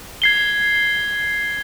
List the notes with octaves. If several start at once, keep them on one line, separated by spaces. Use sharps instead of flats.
G#6 C7 G7